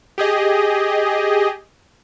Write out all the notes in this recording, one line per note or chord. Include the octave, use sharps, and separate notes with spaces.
G4 G#4 D#5